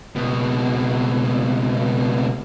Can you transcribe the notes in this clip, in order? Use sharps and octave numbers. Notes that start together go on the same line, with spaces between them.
C#2 B2